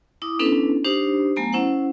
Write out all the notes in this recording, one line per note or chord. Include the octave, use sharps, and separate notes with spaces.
E4 D6 D#6
B3 C#4 D4 E4 A4 B4
D4 D#4 G4 C5
F#3 A3 B3 G#5 A#5
C#4 E4 C5 F#5